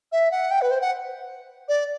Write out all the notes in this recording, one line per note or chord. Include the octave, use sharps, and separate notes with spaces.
E5
F#5
G5
B4
C5
F#5
D5